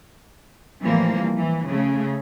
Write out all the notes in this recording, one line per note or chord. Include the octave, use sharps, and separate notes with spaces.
A2 C3 E3 F3 G3 A#3
E3
C#3 A3